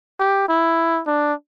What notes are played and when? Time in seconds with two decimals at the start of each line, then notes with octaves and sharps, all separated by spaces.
0.19 G4
0.49 E4
1.07 D4